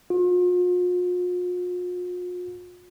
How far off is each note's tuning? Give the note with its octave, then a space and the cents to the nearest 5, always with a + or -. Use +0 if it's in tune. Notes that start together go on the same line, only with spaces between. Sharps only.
F4 +45